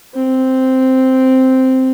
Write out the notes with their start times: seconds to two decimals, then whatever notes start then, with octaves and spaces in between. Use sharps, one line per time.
0.14 C4